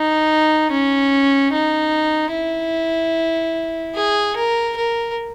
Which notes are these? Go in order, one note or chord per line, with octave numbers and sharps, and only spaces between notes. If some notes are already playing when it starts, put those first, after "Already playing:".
Already playing: D#4
C#4
D#4
E4
G#4
A#4
A#4